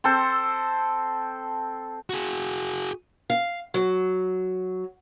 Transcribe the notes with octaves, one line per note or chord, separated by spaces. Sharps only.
C4 A4 C5
F#4 G#4
F5
F#3